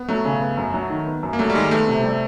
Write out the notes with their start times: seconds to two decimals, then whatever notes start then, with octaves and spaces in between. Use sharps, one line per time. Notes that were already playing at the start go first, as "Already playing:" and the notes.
Already playing: B3
0.09 F#3 A3
0.25 C#3
0.41 B3
0.57 F#2
0.74 F#3
0.90 D#3
1.06 B3
1.23 F#2
1.33 A#3
1.39 F#3 A3
1.50 G3
1.55 D#3 G#3
1.71 A3 B3
1.88 C3
2.04 G3